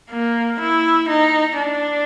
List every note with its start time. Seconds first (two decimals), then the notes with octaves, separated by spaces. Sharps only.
0.11 A#3
0.60 E4
1.09 D#4
1.58 D4